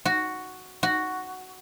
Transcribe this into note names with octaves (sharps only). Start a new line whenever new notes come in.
F#4
F#4